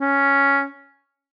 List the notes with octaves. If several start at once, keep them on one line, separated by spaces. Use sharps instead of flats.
C#4